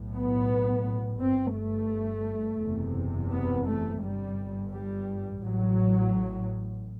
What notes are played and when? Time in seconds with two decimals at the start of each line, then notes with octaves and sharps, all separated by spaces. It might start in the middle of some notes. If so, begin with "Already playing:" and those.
Already playing: B1 A2
0.16 B3
1.21 G1 G2 C4
1.56 A3
2.62 F#1 E2 C3
3.32 B3
3.67 A3
4.02 G1 G2 G3
4.73 G3
5.43 A1 A2 F#3